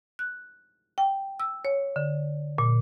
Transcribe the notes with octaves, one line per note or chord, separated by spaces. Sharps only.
F#6
G5
E6
C#5
D3
A#2